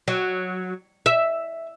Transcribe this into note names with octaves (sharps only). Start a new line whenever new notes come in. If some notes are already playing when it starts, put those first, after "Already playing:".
F#3
E5